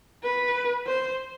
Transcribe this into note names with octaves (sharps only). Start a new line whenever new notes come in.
B4
C5